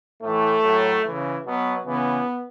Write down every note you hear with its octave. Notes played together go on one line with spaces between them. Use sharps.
A2 E3 A3
A2 F#3
C#3 E3
B2 F#3 B3
C#3 E3 B3